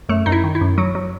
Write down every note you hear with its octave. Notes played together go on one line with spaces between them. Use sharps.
F#2 A3
F#2 D#4
E4
D#3
E4
F#2
F#3
F#3